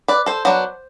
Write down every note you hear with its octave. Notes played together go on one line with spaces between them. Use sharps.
B4 D5
A4 C5
F#3 B3 D4